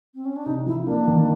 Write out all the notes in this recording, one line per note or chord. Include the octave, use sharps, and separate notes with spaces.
C4
C#4
D4
C3 D#4
F3 E4
A#3 D4
D#3